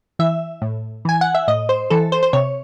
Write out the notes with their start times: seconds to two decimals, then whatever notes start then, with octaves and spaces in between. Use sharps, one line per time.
0.19 E3 E5
0.62 A2
1.05 E3 G#5
1.21 F#5
1.35 E5
1.48 A2 D#5
1.69 C5
1.90 E3 A4
2.12 C5
2.23 C5
2.33 C3 C#5